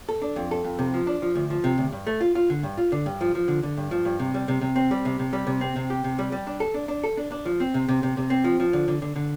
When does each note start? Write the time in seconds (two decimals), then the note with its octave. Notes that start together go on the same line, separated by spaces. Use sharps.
0.09 A4
0.22 D4
0.36 F2
0.51 A4
0.64 F2
0.79 C3
0.94 F3
1.07 D4
1.22 F3
1.35 D2
1.50 F3
1.64 C3
1.78 D2
1.92 G2
2.07 A3
2.21 F4
2.35 F4
2.50 D3
2.63 G2
2.78 F4
2.92 D3
3.06 G2
3.21 F3
3.35 F3
3.48 D3
3.63 D3
3.77 G2
3.91 F3
4.05 G2
4.19 C3
4.34 G3
4.48 C3
4.61 C3
4.76 C4
4.91 G3
5.05 C3
5.19 C3
5.33 G3
5.47 C3
5.61 C4
5.76 C3
5.90 G4
6.04 C3
6.19 G3
6.32 G3
6.47 D4
6.60 A4
6.74 D4
6.88 D4
7.04 A4
7.17 D4
7.32 D4
7.45 F3
7.60 C4
7.74 C3
7.88 C3
8.03 C3
8.17 C3
8.30 C4
8.44 F3
8.60 F3
8.73 D3
8.88 D3
9.02 D3
9.16 D3